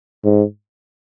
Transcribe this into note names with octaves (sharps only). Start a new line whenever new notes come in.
G#2